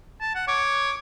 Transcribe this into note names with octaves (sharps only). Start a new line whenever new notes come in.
A5
F#5
C#5 D6